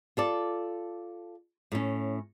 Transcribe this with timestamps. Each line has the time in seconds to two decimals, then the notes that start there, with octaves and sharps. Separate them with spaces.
0.17 F4 A4 D5
1.72 A2 C#4